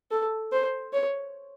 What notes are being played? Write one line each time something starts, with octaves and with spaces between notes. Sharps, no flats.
A4
C5
C#5